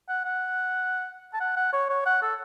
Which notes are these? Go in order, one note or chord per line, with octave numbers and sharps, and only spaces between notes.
F#5
F#5
A5
F#5
F#5
C#5
C#5
F#5
A4